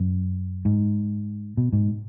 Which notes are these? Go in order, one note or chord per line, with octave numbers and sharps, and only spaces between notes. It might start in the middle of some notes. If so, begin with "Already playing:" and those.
Already playing: F#2
G#2
B2
G#2